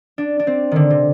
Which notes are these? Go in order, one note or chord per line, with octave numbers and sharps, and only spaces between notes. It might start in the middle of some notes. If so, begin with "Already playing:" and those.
D4
D4
C4
D3 D#3
C3